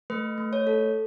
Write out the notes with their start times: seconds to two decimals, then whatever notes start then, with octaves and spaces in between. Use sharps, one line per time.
0.10 A3 B4
0.38 A3
0.53 C#5
0.67 A4